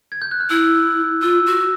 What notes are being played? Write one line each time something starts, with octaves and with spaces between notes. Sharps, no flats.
G#6
G6
F#6
F6
E4 E6
F4 E6
F#4